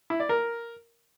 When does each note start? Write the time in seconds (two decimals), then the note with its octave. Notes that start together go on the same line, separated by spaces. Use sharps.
0.10 E4
0.20 D5
0.29 A#4